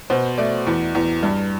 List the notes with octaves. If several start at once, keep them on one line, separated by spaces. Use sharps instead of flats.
B2 C5
A3 D5
E2
E2
G2